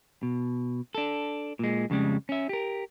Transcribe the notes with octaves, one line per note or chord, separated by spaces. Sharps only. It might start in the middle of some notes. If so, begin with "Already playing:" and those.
B2
D4 A4
A#2 G#3
F2 C#3 G3 G#3
C#4 E5
G4 A#4